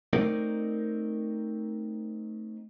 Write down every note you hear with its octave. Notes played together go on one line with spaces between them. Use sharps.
A3 C4 D#4 A#4 D5